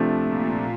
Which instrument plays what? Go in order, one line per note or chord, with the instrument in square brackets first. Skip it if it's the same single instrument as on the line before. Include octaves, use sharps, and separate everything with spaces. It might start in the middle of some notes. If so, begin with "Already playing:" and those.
Already playing: [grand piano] C3 F3 A3 D4
[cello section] A#2